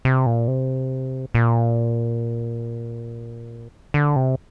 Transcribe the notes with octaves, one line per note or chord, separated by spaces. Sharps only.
C3
A#2
C3
A#2
D3
C3